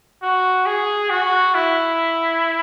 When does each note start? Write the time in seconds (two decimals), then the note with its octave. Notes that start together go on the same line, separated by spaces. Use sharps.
0.23 F#4
0.66 G#4
1.10 F#4
1.55 E4